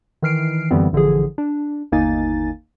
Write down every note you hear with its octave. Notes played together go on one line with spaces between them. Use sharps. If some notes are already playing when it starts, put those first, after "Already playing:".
D#3 E3 F6 C7 D7
F#2 D3 E3 G3 B3 C4
A1 D3 E3 F3 G#4
D4
G1 D#2 A#3 D#4 G#5 A6